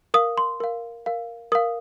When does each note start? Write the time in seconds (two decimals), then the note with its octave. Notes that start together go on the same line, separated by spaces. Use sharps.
0.14 A#4 F5 D#6
0.38 C6
0.60 A#4 F5
1.06 A#4 F5
1.52 A#4 F5 D#6